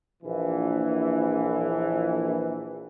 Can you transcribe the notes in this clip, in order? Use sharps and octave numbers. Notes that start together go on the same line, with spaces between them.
A#1 E3